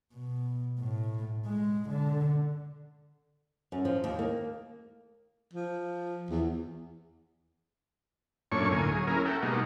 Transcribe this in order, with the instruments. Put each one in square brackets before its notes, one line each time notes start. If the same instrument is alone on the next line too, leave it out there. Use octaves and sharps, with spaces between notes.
[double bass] B2
A2
G#3
D3
[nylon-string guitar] F#2
F3
D#2
A#3
[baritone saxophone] F3
E2
[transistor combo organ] F#2 A#2 A3 D4 C#5 C#6
D2 A2 A#3 G#5
F#3 G#4
A#3 C#4 E4 G#4 A#4
A4 E5 F#5 G5
B2 G3 G#3 A#3 D#4 F#4